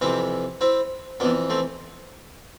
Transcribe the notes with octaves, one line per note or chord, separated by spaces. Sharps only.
F2 C3 E3 C4 E4
C4 E4
F2 E3 B3 D4
A3 C4